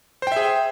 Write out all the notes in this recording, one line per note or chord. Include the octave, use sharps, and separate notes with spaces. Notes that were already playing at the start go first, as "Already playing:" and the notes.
G#4 C5 E5 G5